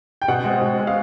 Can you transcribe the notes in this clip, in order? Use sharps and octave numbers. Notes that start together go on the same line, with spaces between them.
G5
B2 F#5
G#3 C4
B2
G#3 C4
F5